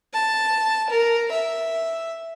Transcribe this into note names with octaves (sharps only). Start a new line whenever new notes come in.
A5
A#4
E5